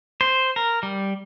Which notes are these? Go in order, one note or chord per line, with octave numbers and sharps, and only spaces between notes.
C5
A#4
G3